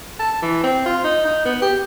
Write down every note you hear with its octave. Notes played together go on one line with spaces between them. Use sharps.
A5
E3
C4
F4
D#4
D#4
B3
G4